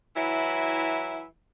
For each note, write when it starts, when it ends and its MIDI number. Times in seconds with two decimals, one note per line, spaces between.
0.16 1.25 52
0.16 1.25 54
0.16 1.25 64